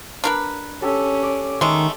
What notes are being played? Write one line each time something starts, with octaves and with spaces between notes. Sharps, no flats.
D4 A#4 B4
C#4 G4 A4 A5
D5
D#3 G#3 A3